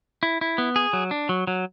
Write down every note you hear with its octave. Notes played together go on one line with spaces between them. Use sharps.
E4
E4
B3
G#4
F#3
D4
F#3
F#3